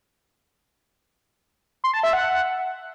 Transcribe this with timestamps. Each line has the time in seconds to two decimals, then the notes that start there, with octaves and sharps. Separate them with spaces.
1.84 C6
1.94 A5
2.03 E5
2.13 F#5